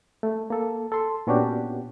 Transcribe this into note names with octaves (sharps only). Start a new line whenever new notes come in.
A3
A#3 A4
A4 C6
A#2 B3 C#4 D4 F#4 G4